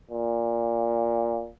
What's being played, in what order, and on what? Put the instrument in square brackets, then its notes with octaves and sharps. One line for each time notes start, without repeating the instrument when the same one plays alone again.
[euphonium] A#2